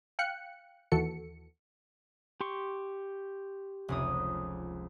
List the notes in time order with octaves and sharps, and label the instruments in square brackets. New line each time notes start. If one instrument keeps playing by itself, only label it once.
[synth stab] F5 G5 F#6 C#7
D#2 E3 F#4 A4 C#7
[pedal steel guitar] G4 C6 C#6
[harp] F1 C#2 D#6